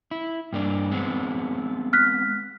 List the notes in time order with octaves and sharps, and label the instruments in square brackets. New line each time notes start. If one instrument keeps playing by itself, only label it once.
[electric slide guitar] E4
G2 A#3 D4
G#3 B3 C4
[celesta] F6 F#6 B6